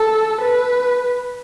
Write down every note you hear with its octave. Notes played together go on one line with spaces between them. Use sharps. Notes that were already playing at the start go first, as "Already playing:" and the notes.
Already playing: A4
B4